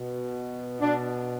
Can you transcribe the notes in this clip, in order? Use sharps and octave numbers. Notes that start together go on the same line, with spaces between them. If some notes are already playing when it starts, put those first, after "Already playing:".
Already playing: B2
B2 D4